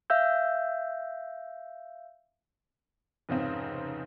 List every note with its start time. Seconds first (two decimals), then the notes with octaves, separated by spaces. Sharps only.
0.10 E5 F5 E6 G6
3.29 F1 G#2 C#3 C4